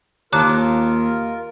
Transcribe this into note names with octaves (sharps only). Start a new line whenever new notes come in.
D#2 F4 A#4 A5 A#5 D6 F#6